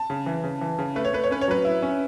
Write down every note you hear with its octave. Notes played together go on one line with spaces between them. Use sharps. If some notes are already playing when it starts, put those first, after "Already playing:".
Already playing: A5
C#3
E3
C#3
E3
C#3
A3 B4
C#5
A3 B4
C#5
C#4 B4
C#5
F#3 B4
E4
C#4